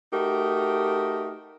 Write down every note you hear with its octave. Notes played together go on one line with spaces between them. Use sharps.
A3 D#4 F#4 G4 A#4